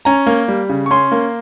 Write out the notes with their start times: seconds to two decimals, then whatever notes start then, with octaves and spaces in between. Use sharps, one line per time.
0.05 C#4 A#5
0.26 A#3
0.48 G3
0.69 C#3
0.86 C#6
0.91 C#4 C6
1.12 A#3